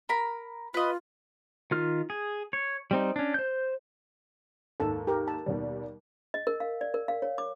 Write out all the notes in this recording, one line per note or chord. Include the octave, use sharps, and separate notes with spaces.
A#4 B5
F4 B4 D#5
D#3 F4 F6
G#4
C#5
G3 C4 D#4
C#4 D4
C5 G6
D#2 G#2 A4 A5
G4 A#4
A5
D#2 B2 G3
D#5
A#4
F5
D5
A#4
F5
C#5
D6